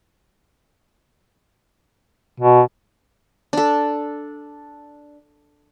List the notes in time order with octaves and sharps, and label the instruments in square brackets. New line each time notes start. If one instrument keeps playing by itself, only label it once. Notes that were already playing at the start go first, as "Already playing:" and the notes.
[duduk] B2
[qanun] D4 A4